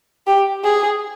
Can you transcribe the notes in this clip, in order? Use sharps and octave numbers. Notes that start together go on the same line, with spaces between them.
G4
G#4